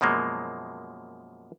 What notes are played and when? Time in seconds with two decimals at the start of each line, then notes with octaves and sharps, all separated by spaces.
0.01 F#2 B2 F3 G#3 A#3